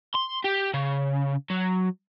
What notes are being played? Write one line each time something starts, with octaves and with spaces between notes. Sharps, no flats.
C6
G4
C#3
F#3